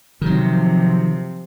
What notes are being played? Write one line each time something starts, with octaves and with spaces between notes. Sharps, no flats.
C3 D#3 F3 F#3